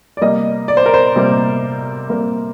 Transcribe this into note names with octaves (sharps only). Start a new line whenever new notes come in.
D5
C3 G3 A#3 D#5
D5
C5
A#4
C5
C3 G3 A#3
C3 G3 A#3